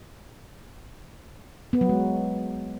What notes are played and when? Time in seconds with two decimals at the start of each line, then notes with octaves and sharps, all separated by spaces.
1.73 B3
1.81 F#3
1.89 G#3